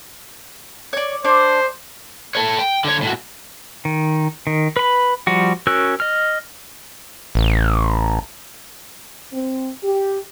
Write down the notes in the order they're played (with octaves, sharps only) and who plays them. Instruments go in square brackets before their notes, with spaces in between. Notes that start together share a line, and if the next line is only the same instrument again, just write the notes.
[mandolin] C#5 D5
[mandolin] D4 [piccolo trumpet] C5
[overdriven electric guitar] A4 C#5
G5
D3 C#5
A2 F#4
[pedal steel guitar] D#3
D#3
B4 B5
F3 G3 F#4
C#4 F#4 A#4 E6 F#6
D#5 F6
[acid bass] A1
[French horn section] C4
G4